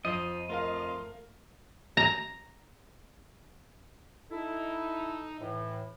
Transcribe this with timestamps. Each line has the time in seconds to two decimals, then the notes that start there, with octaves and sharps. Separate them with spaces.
0.05 F2 F3 D#5
0.49 A3 F4 A#4 F5
1.97 A#5
4.31 D#4 E4 A4
5.40 A2 E3